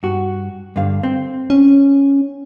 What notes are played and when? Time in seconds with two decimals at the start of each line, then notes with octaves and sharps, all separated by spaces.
0.03 G2 F#4
0.76 G2 D3 F5
1.03 C4
1.50 C#4